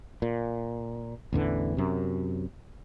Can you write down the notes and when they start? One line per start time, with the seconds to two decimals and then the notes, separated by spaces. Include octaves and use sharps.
0.22 A#2
1.33 A1 E2 D3 E3
1.77 F#2 C3